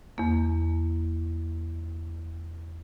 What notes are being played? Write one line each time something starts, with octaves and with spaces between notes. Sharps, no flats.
E2 A#3